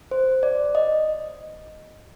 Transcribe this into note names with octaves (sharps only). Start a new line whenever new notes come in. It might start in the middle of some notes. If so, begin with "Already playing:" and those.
C5
D5
D#5